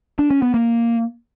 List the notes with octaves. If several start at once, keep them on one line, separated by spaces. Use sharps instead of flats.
D4
C#4
B3
A#3